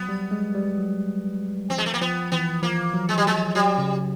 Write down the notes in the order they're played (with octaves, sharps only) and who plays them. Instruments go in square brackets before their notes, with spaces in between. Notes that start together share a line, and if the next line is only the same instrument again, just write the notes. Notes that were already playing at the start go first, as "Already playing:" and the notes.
Already playing: [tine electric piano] F#3 [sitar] B3
[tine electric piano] G3
G#3
G3
F#3
[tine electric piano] F3 [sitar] C4
[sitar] G#3
A3
A#3
[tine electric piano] F3 [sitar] B3
[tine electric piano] E3 [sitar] B3
[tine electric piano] F3 [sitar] A#3
[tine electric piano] F#3
[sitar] G#3
G3
[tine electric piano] F#3 [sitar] G#3
[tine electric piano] F#3 [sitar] G3
[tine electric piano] C#3